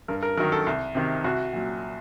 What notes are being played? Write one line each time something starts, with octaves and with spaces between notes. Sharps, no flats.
G2 A#4
A#4
D#3 F#3 A#4
A4
C2
C3 D#3
C2 F#4
A#2 F#3